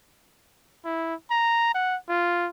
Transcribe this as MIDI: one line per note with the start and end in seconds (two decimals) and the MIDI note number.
0.85 1.14 64
1.31 1.69 82
1.75 1.96 78
2.09 2.48 65